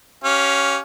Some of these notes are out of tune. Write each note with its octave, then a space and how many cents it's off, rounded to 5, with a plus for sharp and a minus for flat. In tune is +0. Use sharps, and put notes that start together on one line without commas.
C#4 +0 G4 -30 F5 +0